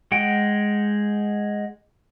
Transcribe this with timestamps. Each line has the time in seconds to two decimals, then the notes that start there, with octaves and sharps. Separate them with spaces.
0.12 G#3 F#5 G5